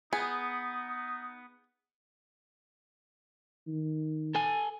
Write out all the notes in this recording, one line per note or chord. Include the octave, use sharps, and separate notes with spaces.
B3 D#4 G#4
D#3
A4 G#5